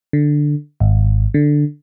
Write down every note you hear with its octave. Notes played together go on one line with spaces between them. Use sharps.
D3
G#1
D3